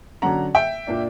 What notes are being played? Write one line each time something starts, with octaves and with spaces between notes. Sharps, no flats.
D3 F#3 C#4 F#5 A#5
E5 G5
A#2 A#3 D4